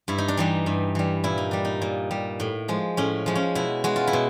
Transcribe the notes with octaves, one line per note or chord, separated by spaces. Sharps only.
G2 E4
D#4
D4
E3 G3 D#4
G2
E3 G3
A#2 E4
D#4
G3 D4
D#4
A#2
G3
A2
F3 G#3
A2 C#4
F3 G#3
C#4
B2 E4
G#3 F#4
F4
E4
B2